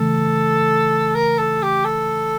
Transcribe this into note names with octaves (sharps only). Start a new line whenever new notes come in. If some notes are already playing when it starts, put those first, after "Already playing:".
Already playing: C#3 E3 A3 A4
A#4
A4
G4
A4